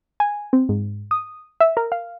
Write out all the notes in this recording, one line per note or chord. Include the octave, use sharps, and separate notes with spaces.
G#5
C4
G#2
D#6
E5
A#4
F5